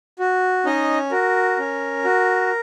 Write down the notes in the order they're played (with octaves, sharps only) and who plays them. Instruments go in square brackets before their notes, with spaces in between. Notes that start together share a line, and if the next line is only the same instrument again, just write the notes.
[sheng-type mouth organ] F#4
C#4 D#4 D#5
F#4 A#4
C#4
F#4